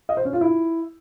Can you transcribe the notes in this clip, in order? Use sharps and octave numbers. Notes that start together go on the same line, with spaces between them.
D#5
C5
C#4
F4
E4